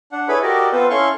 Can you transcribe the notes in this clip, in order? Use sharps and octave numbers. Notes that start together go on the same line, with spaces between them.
D4 F#5
E4 G#4 A4 B4 C#5 B5
F#4 G4 A4 A#4 D5 D#5
B3 C4 F4 A4 B4 C5
C#4 E4 A4 F5 C6 C#6